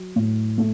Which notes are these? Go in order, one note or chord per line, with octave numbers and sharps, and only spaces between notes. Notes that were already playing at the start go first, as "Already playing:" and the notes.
Already playing: F#3
A2
A3